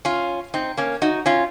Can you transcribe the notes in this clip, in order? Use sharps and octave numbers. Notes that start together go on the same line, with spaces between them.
C#4 F4
C4 D#4
A#3 C#4
D#4 F#4
C#4 F4